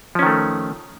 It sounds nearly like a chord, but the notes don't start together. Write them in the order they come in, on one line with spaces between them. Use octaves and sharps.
F3 C#4 D#3 A3